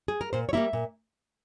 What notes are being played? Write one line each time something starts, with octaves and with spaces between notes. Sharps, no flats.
G#4
A#4
A#2 C5
C#5
G3 A#3 E4 E5
A#2